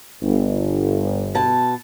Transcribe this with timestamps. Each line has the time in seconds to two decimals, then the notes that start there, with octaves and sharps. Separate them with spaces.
0.21 G1
1.35 B2 A5